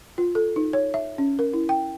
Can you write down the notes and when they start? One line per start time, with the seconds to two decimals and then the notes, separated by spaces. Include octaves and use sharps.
0.18 F4
0.35 A4
0.56 D#4
0.73 C#5
0.94 E5
1.18 C#4
1.39 A#4
1.53 E4
1.69 G5